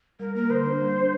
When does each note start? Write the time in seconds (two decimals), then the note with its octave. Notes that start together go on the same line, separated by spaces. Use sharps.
0.20 G3 A#4
0.35 A#3 A#4
0.50 D3 C5
0.66 D4
0.81 G3
0.96 D4